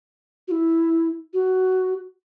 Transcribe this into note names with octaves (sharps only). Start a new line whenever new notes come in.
F#4
E4
F#4